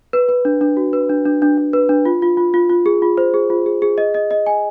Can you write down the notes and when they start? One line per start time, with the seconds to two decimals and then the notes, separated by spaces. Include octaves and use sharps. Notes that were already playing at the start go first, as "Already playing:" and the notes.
0.13 B4
0.29 B4
0.45 D4
0.61 D4
0.77 F#4
0.93 B4
1.10 D4
1.26 D4
1.42 D4
1.58 D4
1.73 B4
1.89 D4
2.05 F4
2.22 F4
2.37 F4
2.54 F4
2.69 F4
2.86 G#4
3.02 F4
3.18 C5
3.34 G#4
3.50 F4
3.66 G#4
3.82 G#4
3.98 D#5
4.14 D#5
4.31 D#5
4.46 G#5